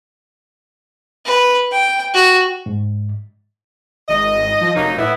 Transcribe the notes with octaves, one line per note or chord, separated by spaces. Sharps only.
B4
G5
F#4
G#2
G#1 D#5
F3
F1 F#3 A#3 D#4
A2 B3 E4